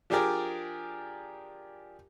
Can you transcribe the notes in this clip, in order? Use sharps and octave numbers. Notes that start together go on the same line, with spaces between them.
F3 D4 G4 G#4 A#4 D5